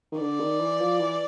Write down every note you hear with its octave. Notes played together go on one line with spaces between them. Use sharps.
D#3
D3 D5
D#3
E3
F3
E3